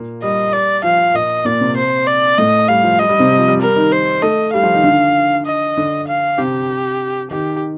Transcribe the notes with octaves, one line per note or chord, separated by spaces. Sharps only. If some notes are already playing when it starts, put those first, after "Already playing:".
Already playing: A#2 A#3
G3 D#5
D5
F3 F5
A#2 A#3 D#5
A#2 A#3 D5
C3 C4
C5
D5
A2 A3 D#5
G3 F5
F3
G3 D#5
G3
C3 C4
G3
F3
G3
G3 A#4
D#3 D#4
C5
A3 A4 D#5
G3 G4 F5
F3 F4
D#3 D#4
D3 D4
D#5
D3 D4
F5
C3 C4 G4
D#3 D#4 G4